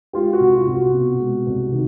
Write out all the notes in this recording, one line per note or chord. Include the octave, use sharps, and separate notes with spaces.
G#3 F4 G4
F#4
C2
F4
C2
F#4
B2
G#3
C2
D#3